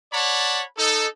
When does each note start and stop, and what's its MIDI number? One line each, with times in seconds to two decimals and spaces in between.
0.13 0.63 73
0.13 0.63 74
0.13 0.63 78
0.13 0.63 81
0.13 0.63 83
0.77 1.07 63
0.77 1.07 69